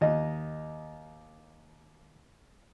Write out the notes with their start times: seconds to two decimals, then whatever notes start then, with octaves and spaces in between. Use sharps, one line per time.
0.01 D#2 D#5